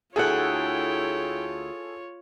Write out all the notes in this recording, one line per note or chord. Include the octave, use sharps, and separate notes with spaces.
D2 E4 F4 G#4 A4 C#5 F#5 G5